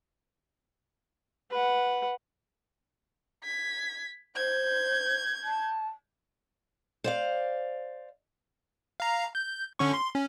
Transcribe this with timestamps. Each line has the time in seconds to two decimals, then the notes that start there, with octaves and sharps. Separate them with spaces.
1.51 B4 F#5
3.44 G#6 B6
4.36 C5 G6 G#6
5.44 A5
7.04 C5 D5 F5
9.00 F5 A#5
9.35 G6
9.79 D3 C#4 C#6
9.93 C6
10.14 C#4